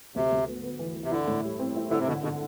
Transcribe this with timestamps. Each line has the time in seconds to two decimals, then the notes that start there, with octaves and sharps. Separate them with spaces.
0.16 D2 C3
0.32 D2
0.48 B3
0.64 B3
0.79 E3
0.95 E3
1.04 C3
1.12 D3 E4
1.28 A2
1.44 G3
1.59 C4
1.76 E4
1.90 D3 E4
1.99 C3
2.08 B2 D3
2.23 B2 D3